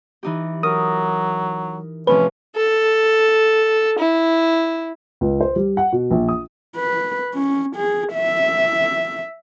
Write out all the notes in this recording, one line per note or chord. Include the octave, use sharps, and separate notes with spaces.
E3 D#4 G4
F#3 A#4 D#6
A2 C3 F3 C#4 B4
A4
E4
C#2
C5
G3
F#5
B2
A#1
D#6
B4
C#4
G#4
E5